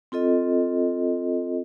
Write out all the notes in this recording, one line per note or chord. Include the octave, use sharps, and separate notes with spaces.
C4 F4 A4 D#5